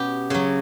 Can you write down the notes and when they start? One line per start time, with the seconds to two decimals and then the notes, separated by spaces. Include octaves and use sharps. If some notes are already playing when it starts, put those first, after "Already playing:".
Already playing: B2 B3 C#4 G4
0.30 C#3 F#3